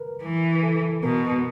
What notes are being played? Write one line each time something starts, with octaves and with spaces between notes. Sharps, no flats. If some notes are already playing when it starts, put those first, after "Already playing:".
Already playing: A#4 B4
E3
A4
B2 A#4